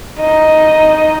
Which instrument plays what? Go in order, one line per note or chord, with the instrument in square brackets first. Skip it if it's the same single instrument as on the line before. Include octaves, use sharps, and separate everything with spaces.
[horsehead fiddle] D#4 D#5